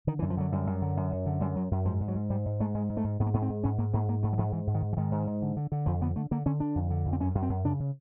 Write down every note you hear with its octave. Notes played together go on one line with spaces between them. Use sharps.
D3 D#3
E3
F#2
F3
D3 F#3
F#2 G3
F#2
D3
F#2
F#2
D3
F#2 G3
F#2 F#3
F#2
G#2 F3
G#2
F#3
G#2
G#2 G3
G#2
G#2 A3
G#2 G#3
G#2
A3
G#2
G#2 B3
A#3
G#2 B3
C4
G#2
G#2 C#4
G#2 A#3
G#2 A#3
G#2 A#3
G#2 A3
F#3
G#2 F3
G#2 E3
G#2
D#3
G#2
E3
G#2 D#3
G#2
G#2
D3
D3
D3
F2 F3
D3 B3
D3 A3
D3 A#3
D3 C#4
D3 D4
F2
D3
F2
C4
F#2 C#4
F#2
C4
F#2
C#3 D4
C#3